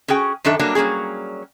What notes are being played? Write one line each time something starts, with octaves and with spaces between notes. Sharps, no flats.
C#4 F#4 G#4 G5
F#2 D#3 D4 A4 E5
F#3 G3 A#3 D4
F#3 G3 A#3 C#4 G#4